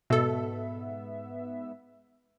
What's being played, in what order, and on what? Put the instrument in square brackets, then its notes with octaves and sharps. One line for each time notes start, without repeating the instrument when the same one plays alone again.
[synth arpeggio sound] G#2 B3 E5 [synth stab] B2 A4